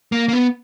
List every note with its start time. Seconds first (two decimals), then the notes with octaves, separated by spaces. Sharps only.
0.12 A#3
0.28 A#3
0.33 B3